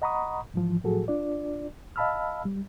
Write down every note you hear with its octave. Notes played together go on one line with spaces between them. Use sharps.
D#5 F#5 A#5 B5 C#6 D#6
G#2 E3 F3
A2 F3 F#3 F#4 G#4 A4
D4 F4 D5
D#5 F5 A5 B5 E6 F6
G3